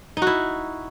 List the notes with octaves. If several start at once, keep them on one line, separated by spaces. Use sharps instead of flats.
D#4 E4 F#4